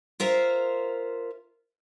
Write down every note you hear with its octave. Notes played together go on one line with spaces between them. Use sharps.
F4 A#4 C5 E5 F5